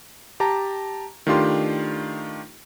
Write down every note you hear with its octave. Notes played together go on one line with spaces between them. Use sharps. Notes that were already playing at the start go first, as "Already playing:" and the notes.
G4 A5 A#5
D#3 A3 D4 F4 G4 C6